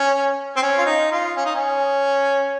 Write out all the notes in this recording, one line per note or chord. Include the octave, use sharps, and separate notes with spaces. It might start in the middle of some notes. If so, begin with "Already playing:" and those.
Already playing: C#4
C4
C#4
F4
D#4
F4
C#4
D#4
C#4